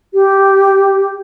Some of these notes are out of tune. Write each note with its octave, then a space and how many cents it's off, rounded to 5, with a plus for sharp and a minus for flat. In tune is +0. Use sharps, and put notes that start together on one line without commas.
G4 -5